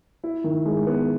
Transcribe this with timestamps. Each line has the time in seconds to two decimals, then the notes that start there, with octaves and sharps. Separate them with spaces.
0.24 E4
0.44 D#3
0.66 G#3
0.87 B3